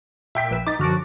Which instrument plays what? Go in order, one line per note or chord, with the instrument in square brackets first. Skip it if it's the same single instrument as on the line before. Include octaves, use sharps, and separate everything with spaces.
[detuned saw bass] A#2 [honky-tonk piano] E5 G5 B6
[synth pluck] A#1 B4 E7
[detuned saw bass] D#4 [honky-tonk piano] D6 A6
[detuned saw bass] F#2 [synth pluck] D3 F6 D7 [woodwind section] F3 F#4